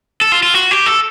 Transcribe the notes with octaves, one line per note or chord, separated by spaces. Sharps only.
A4
F4
F4
F#4
G4
A4